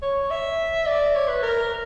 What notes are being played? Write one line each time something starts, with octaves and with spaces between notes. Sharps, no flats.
C#5
E5
D5
C#5
B4
A#4